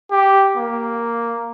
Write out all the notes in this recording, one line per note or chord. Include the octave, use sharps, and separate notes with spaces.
G4
A#3